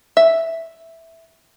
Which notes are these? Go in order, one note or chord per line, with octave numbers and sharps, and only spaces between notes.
E5